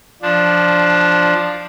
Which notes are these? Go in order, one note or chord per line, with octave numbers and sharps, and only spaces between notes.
F3 D4